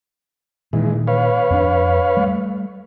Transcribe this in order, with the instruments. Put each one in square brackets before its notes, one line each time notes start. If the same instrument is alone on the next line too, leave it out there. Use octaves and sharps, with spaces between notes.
[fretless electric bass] A#2 D#3 [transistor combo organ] E3 G#3
[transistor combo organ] B4 C#5 F5
[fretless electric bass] F2 B3 D4
G3 A3